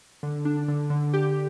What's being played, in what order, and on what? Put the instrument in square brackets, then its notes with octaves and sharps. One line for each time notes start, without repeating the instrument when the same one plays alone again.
[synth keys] D3
D4
D3
D3
G4